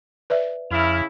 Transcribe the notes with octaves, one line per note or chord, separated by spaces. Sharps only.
B4 D5 E5
F2 C#3 E4 F6